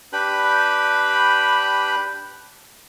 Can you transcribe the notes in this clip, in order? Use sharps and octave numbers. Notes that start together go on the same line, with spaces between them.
D4 G4 B4 B5